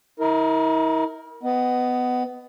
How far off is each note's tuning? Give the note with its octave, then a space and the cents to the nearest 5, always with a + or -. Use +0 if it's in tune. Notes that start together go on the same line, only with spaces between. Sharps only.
E4 -45 A#4 +0
B3 +20 D#5 -10